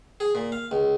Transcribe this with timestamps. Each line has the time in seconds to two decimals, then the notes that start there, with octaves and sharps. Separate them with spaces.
0.20 G#4
0.35 A#2
0.52 F5
0.71 C#2